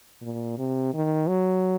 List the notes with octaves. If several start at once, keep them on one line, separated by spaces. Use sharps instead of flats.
A#2
C3
D#3
F#3